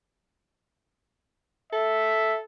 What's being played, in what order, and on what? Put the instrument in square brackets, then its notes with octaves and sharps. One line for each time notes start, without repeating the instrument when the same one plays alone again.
[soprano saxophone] A4 [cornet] E5